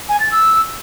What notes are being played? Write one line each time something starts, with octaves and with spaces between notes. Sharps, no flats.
G#5
A6
E6